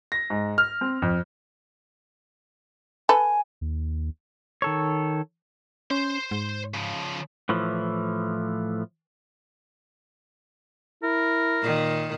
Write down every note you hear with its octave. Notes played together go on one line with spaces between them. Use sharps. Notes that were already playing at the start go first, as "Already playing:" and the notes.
A#6
G#2
F6
C4
F2
A4 B4 G#5
D#2
D#3 A4 C#5
C#4 C5 C6
G#2
C#3 F3
A2 E3 F3
E4 A#4
A#2 D#3